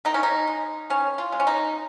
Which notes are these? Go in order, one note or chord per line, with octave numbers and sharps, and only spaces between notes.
D#3 D#4
C#4
D#4
G#3
D#3 C#4
F4
G#3
C#4
D#4